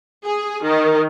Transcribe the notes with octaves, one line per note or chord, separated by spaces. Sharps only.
G#4
D#3